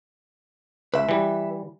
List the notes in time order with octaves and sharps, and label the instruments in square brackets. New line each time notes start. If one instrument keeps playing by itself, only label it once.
[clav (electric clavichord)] C#2 [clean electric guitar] B4 E5
[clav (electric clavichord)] E3 G3